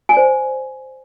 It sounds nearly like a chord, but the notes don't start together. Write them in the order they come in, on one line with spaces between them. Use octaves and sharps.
G#5 D5 C5